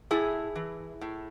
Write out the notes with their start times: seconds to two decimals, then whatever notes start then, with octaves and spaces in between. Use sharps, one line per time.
0.11 A2 E4 G#4
0.55 E3
1.01 A2